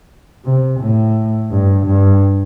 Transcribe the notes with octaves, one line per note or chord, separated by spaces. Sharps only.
C3
A2
G2
G2